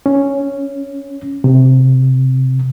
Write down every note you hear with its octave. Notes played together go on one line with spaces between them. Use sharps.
C#4
C3